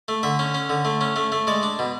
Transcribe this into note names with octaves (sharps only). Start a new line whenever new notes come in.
A3
D3 E5
C#4
C#4
D3
A3
C#4
A3
A3
G#3 D5
D4
B2